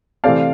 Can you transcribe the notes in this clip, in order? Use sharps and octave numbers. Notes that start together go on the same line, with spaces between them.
C3 E3 A3 C4 D5 F5